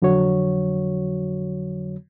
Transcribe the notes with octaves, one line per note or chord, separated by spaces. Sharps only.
F2 D3 F#3 F#4 C#5